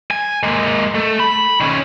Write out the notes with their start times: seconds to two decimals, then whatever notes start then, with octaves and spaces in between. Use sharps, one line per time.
0.11 G#5
0.43 G#3 A#3
0.95 A3
1.20 B5
1.61 D#3 C#4